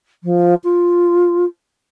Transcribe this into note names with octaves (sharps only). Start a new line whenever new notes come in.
F3
F4